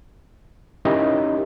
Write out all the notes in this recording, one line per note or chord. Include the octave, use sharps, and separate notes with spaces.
C#4 D#4 E4 G4 A#4 D#5